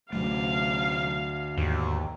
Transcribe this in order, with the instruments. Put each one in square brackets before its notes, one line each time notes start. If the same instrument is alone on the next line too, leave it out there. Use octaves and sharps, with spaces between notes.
[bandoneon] D2 [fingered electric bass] C3 F#3 A3 [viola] F5
[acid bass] D#2 [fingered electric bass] G#2